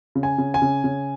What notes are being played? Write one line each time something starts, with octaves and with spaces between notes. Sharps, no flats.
C#3
G#5
C#3
G#5
C#3
C#3